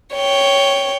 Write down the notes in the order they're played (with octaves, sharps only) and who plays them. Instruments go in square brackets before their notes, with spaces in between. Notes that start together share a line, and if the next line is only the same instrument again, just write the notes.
[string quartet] C#5 G5